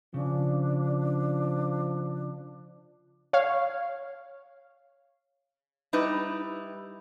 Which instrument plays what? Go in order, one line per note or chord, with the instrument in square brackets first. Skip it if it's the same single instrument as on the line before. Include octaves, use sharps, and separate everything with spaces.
[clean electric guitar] C#3 [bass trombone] F3 [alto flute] D4
[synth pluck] C#5 F5
[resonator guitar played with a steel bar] G3 D#4 E4 B4